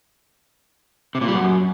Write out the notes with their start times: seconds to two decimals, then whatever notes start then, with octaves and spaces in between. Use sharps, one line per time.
1.15 C3
1.21 A#2
1.28 G3
1.34 F#2